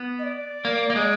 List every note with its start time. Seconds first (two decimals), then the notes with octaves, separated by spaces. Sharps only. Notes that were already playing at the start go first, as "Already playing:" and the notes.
Already playing: B3
0.19 D#5
0.23 D5
0.65 A#3
0.90 A#3
0.96 G#3